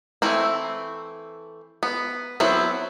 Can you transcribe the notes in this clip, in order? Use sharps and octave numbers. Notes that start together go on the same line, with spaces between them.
E3 A3 C4 E4
B3
F#3 B3 C4 E4